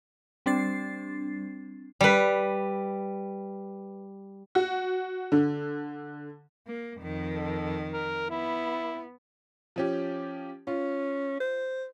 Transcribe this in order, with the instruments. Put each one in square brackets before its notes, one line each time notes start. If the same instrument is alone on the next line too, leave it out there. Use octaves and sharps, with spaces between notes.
[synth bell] G3 C4 D4 A6 C7
[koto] G3 B4
[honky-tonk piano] F#4
D3
[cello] A#3
F2 D#3
[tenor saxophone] A4
A#4
[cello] B3 [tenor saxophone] E4
[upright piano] F3 C#4 G4
[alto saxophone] C#4 [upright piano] F4
[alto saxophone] C5